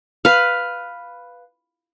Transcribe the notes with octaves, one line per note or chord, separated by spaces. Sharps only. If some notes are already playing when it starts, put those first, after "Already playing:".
B4 F5